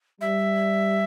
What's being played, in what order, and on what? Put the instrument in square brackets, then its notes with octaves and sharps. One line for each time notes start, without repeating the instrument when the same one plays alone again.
[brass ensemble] G3 [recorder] E5